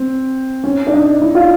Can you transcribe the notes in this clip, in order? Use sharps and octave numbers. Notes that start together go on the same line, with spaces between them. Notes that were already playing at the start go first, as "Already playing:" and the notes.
Already playing: C4
C#4
D4
D#4
E4
F4